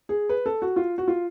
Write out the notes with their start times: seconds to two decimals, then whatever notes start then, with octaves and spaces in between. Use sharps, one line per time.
0.09 G#4
0.29 B4
0.46 A4
0.62 F#4
0.76 F4
0.98 F#4
1.08 F4